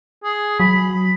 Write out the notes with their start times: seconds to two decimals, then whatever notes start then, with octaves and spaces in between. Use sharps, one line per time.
0.24 G#4
0.60 F#3 B5